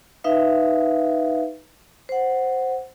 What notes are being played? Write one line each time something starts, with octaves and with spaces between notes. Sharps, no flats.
D#4 B4 E5 F5
C5 F#5